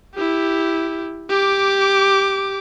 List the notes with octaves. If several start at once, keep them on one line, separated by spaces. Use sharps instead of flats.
E4 G4
G4 D6